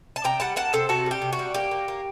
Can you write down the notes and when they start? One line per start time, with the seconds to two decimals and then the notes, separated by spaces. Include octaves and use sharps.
0.16 A5
0.24 C3 G5 A#5
0.40 G3 F#5 A5
0.56 A#3 F#5 A5
0.73 C3 A4 C5
0.89 C3 F#4 A4
1.06 G3 G4
1.22 C3
1.33 F#4
1.39 G3
1.54 A#3 G4
1.71 A#3
1.88 A#3